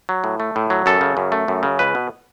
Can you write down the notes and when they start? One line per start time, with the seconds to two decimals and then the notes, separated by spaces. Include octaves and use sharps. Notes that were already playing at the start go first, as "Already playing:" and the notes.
0.09 F#3
0.24 A2
0.40 A3
0.56 A2
0.70 F#3
0.86 F#2 A4
1.01 C#3
1.17 F#2
1.32 A3
1.48 F#2
1.63 C#3
1.79 C#2 B4
1.95 B2